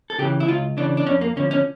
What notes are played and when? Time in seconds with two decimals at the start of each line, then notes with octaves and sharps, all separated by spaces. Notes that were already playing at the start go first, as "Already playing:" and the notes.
0.10 A4
0.18 C#3 E3 G4
0.40 E4
0.48 C#2 F4
0.77 C#3 E3 D4
0.97 D4
1.07 F2 C#4
1.21 A#3
1.36 D3 C#4
1.40 F3
1.51 C#4